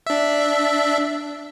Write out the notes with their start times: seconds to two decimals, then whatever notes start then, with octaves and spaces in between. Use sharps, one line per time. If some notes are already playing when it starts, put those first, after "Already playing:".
0.06 D4 E5